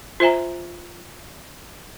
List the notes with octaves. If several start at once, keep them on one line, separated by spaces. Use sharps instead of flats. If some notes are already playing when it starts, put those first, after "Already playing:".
F4 C5 E5 G#5 A#5